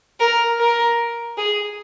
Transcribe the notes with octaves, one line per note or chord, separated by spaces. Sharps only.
A#4
A#4
G#4